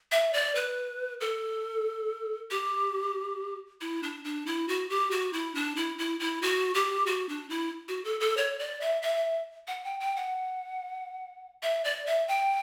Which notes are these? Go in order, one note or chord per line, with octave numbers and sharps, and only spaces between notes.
E5
D5
B4
A4
G4
E4
D4
D4
E4
F#4
G4
F#4
E4
D4
E4
E4
E4
F#4
G4
F#4
D4
E4
F#4
A4
A4
C#5
D5
E5
E5
F#5
G5
G5
F#5
E5
D5
E5
G5